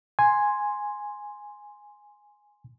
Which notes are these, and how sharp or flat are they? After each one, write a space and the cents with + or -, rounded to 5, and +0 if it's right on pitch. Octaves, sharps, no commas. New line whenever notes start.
G#5 +0 C6 +0